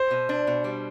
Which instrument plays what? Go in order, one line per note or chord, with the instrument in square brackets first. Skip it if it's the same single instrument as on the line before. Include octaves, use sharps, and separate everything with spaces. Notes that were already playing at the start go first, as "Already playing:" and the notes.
Already playing: [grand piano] C5
[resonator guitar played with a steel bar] B2
D4
B2
G3